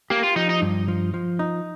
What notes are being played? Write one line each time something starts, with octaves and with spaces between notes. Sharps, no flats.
A#3 G4
F4
F3 D#4
D#4
G2
F3
F3
D#4